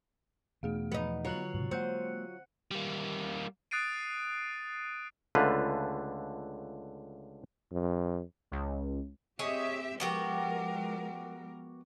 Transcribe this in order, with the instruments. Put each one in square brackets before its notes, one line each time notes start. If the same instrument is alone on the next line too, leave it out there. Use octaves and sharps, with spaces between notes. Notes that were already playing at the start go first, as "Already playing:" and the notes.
[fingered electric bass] E2 B2 [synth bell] A3 G#4 F5
[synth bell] F3 [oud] B3 D#4
[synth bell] D3 F#6 F#7 [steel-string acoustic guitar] F#3 F4 C#5
[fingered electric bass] G#2 C3
[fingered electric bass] G#3 A#3 [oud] C4 [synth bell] F#5 F#6 C#7
[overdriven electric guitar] G3 A#3
[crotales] D#6 F#6 A6 C7 D7 D#7
[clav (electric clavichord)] C#2 D3 A3 F4 B4
[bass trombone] F2
[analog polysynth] C#2
[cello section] C4 G4 E5 [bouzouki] G#4 C#5 D#5
[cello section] F3 G#3 A#4 [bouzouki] B3 F#4 G4